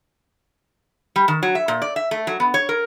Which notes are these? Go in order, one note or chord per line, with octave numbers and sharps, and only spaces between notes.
G3
D#3
F#3
E5
A#2
D5
E5
A3
F#3
B3
C#5
A#4